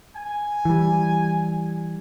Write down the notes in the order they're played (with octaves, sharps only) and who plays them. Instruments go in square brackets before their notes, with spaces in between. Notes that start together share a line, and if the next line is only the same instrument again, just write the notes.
[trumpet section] G#5
[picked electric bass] E3 G3